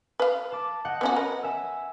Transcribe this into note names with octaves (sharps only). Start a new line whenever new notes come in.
B4 F5
A5 D6
D#5 F#5 G5
B3 C#4 F#4
A#4 B4
E5 G#5 E6